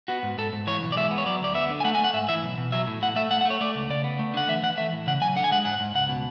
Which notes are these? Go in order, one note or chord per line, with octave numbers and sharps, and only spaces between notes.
B3 F#4
G#2
G#2 A4
G#2
E3 C#5
B1
D5
G#3 E5
B3
C#5
F#3 D5
D2 D5
B3 E5
D3
G#5
A3 F#5
G#5
A3
F#5
G#2 E5
E3 E5
B1
B2
F#3 E5
A2
A2 F#5
A3 E5
A3 F#5
F#5
A3
C#5
A3 D5
C#2
C#3 D5
B3
A3
D3 F#5
E3 E5
E3 F#5
A3 E5
A2
C#3 F#5
F#3 G#5
D3 F#5
G#5
G#3 F#5
G#2 F#5
G#2
C#2 F#5
B2